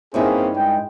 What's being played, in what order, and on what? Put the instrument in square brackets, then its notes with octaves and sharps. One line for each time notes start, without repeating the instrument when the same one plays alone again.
[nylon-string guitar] G2 D#4 E4 [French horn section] A#3 C4 C#4 [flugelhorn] G#4
[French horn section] G#3 [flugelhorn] G5